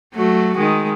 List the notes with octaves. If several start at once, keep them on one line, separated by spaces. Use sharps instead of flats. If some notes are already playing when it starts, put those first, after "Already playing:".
F#3 A3 F#4
D#3 G#3